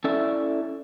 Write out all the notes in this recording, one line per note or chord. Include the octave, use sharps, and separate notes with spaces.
C#4 E4 A4 D5 E5